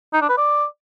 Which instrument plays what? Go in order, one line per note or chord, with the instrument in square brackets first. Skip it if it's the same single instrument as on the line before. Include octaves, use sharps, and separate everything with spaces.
[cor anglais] D#4
D4
B4
D5